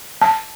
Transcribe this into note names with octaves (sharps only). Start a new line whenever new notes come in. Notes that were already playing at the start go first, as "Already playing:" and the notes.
A5